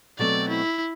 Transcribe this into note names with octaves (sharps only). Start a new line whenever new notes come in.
B2 F#3 A3 C4 D5
E4